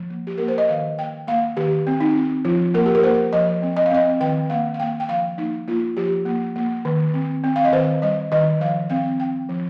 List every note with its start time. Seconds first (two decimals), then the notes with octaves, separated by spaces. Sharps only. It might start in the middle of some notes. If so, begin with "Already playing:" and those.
Already playing: F3
0.10 A#3
0.27 G4
0.38 A#3 A#4
0.48 C5
0.58 D#5
0.69 D#3 F5
0.98 A#3 G5
1.27 A#3 F5
1.57 D#3 G4
1.87 C4
2.00 D#4
2.16 C4
2.45 F3 F4
2.74 A#3 A#4
2.86 G4
2.95 A#4
3.03 A#3 C5
3.33 F3 D#5
3.62 C4
3.77 D#5
3.86 F5
3.91 C4 D#5
4.21 D#3 G5
4.50 A#3 F5
4.74 F5
4.80 A#3 G5
5.00 G5
5.09 F3 F5
5.38 A#3 D#4
5.68 A#3 F4
5.96 F3 G4
6.25 A#3
6.56 A#3
6.85 D#3
7.14 C4
7.44 C4
7.56 F5
7.64 D#5
7.73 D#3 C5
8.02 G3 D#5
8.32 D#3 D#5
8.60 F3 F5
8.90 C4 F5
9.19 C4 G5
9.49 F3